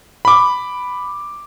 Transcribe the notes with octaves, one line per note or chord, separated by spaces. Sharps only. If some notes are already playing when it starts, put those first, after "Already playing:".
B5 D6